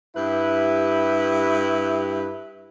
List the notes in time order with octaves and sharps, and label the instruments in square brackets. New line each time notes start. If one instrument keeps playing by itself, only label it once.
[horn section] G2 E4 G4 B4